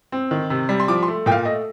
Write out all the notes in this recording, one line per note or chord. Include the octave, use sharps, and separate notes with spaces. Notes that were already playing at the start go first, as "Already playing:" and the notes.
C4
D#3
C3
G3
C6
F3 D6
C6
A3
A#2 G5
F5
A3 D#5